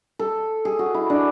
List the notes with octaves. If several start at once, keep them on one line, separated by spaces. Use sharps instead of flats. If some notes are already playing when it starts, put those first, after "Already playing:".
A4
G#4
F#4
E4
D4